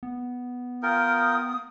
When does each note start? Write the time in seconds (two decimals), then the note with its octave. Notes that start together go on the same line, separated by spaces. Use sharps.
0.03 B3
0.83 F4 A#4 G5 D#6